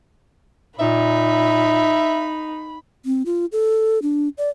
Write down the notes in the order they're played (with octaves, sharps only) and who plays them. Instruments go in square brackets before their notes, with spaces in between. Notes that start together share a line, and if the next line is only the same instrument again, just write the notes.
[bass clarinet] A#2 [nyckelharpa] D#4 [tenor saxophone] E5 [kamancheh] B5
[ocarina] C4
F4
A4
D4
D5